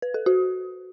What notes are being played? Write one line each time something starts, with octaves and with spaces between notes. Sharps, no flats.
B4
A4
F#4